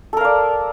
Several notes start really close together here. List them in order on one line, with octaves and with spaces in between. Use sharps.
A4 A#4 F5 D5